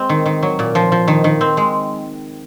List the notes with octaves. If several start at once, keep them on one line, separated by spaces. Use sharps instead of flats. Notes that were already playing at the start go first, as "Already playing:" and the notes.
Already playing: G#3 C4
D#3
D#3
F#3
A#2
F3
F3
D#3
D#3
C4
G#3